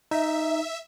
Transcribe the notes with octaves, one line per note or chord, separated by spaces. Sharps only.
D#4 E5